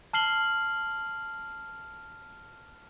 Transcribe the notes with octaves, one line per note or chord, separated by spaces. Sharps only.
A5 F6 C7 F#7 G7